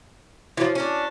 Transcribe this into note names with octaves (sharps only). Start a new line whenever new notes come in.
E3 F3 E4 F#4 C#5
C#4 D4